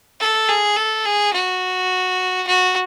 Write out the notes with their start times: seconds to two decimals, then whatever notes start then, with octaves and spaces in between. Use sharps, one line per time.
0.20 A4
0.49 G#4
0.77 A4
1.05 G#4
1.33 F#4
2.47 F#4